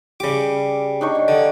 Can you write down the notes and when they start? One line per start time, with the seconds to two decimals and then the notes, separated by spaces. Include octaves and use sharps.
0.20 C#3 G3 G4 D6
1.01 D4 D#4 C#5
1.15 G5
1.28 D3